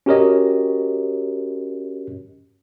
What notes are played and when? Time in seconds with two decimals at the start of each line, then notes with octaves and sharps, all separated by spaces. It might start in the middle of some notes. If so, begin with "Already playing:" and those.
0.06 C#4 F#4 G4 A#4 C#5 D#5